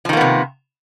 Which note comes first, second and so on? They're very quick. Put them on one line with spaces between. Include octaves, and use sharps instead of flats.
F3 D#3 A#3 B3 C3